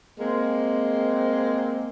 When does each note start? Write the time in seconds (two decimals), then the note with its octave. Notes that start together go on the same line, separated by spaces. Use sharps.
0.20 G#3 A#3 C4